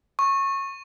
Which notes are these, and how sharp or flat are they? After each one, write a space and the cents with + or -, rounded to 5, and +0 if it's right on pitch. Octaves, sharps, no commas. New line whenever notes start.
C#6 -15